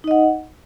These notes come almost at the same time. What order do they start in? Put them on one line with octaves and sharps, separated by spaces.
D#4 D#5 F#5